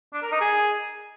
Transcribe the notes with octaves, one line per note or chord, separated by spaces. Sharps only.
D4
A#4
D#4
G#4